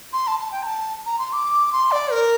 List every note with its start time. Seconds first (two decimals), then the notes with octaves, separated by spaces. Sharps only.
0.13 C6
0.27 A5
0.40 A5
0.52 G5
0.63 A#5
0.66 A5
1.06 A#5
1.19 C6
1.33 D6
1.72 C6
1.92 D5
2.12 A#4